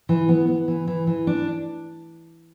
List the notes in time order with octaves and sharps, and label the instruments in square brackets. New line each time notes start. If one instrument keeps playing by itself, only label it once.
[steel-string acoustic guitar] E3
B3
B3
E3
E3
E3
D4